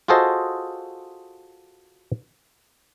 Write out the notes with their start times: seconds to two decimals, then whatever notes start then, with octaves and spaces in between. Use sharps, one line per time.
0.08 F4 F#4 G#4 A4 C5 D#5